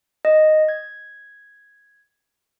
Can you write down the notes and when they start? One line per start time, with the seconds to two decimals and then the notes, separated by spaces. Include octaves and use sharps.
0.25 D#5
0.69 G#6